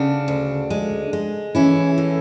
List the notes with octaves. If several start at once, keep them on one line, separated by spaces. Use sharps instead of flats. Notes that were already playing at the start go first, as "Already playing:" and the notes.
Already playing: C#3 D4 F#4
D2
G#3
G#3
E3 C#4 E4
A2